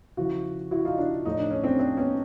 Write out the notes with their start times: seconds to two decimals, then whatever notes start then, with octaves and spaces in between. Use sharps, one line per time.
0.17 C#3 F3 E4 F#4
0.71 E4 F#4
0.85 D#4 F4
0.98 D4 E4
1.26 A2 F3 D#4
1.39 D4
1.51 C#4
1.63 C4 D4
1.79 C4 D4
1.97 B3 C#4